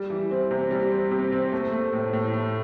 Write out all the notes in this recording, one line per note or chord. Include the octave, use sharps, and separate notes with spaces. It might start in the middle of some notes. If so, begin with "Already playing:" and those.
Already playing: G3
E3
C4
C3
G3
C4
C3
C4
A3
A3
A2
A2
A3